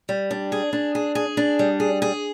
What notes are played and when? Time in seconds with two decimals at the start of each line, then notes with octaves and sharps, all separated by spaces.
0.09 G3
0.31 D4
0.52 G#4
0.73 D4
0.95 G#4
1.15 G#4
1.37 D4
1.59 G3
1.80 G#4
2.02 G#4